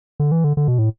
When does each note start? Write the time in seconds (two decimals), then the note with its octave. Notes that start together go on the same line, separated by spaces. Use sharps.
0.20 D3
0.32 E3
0.44 D3
0.57 D3
0.68 B2
0.79 A2